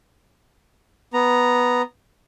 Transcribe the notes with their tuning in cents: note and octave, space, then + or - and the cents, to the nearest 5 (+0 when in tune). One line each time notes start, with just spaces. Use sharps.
B3 +0 A#5 +0